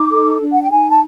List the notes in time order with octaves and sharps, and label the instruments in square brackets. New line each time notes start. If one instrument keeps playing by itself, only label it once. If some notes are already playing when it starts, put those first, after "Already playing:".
Already playing: [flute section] D#4 D6
A4
D4
F#5
G5
D#4 G#5
A5